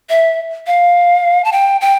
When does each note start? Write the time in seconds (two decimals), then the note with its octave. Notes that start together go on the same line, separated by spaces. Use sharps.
0.09 E5
0.67 F5
1.44 A5
1.52 G5
1.81 G5